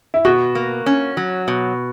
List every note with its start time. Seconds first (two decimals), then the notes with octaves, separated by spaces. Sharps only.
0.14 E4
0.25 B2 F#4
0.55 A#3
0.86 C#4
1.17 F#3
1.48 B2